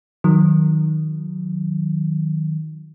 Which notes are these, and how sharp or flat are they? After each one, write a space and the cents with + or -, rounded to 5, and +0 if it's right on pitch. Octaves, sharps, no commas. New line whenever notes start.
D#3 +0 F#3 -20